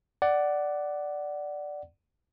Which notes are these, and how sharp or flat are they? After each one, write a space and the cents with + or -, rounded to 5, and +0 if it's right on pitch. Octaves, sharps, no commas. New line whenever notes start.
D5 +0 F#5 +15